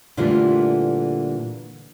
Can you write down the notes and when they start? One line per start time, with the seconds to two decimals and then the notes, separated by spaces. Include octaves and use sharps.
0.17 A#2 D3 E3 G3 A3 F4